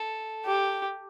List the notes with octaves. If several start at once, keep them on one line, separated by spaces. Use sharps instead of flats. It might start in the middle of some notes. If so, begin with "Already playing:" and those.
Already playing: A4
G4